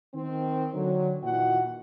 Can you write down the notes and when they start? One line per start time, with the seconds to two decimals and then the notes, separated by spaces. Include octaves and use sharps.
0.14 D#3 C4
0.73 D3 F#3
1.22 A#2 D#3 E3 F#4 F#5